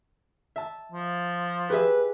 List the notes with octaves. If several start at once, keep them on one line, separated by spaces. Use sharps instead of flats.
E5 A5
F3
G4 G#4 B4 E5